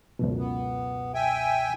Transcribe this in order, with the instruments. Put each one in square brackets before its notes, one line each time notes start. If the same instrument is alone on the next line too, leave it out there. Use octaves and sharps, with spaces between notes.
[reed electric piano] C#2 F#2 B2
[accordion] B3
E5 G5 G#5